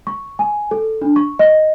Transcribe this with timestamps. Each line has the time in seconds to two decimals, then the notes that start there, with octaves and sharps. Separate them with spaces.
0.07 C#6
0.39 G#5
0.71 A4
1.02 D4
1.16 C#6
1.39 D#5